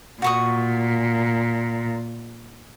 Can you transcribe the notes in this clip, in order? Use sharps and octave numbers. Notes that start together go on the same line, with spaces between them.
A#2 F#4 C#6 D#6